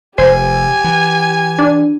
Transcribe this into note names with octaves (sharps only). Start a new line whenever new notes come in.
F1 G4 C5 G#5
E3
D4